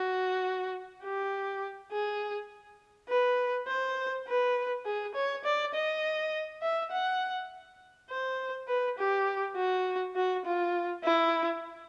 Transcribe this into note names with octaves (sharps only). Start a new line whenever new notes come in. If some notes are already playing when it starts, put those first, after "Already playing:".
Already playing: F#4
G4
G#4
B4
C5
B4
G#4
C#5
D5
D#5
E5
F#5
C5
B4
G4
F#4
F#4
F4
E4